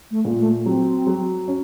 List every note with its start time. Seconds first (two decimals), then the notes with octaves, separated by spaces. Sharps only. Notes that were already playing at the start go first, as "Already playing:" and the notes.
0.11 A3
0.25 A#2
0.39 A3
0.66 F#3 C4
1.07 F#3
1.48 C#4